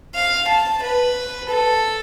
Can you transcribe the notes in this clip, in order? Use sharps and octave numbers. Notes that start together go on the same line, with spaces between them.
F5
A5
B4
A4